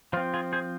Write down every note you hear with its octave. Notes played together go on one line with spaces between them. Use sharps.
F3 C4 F4
F4 G#4
G#4 C5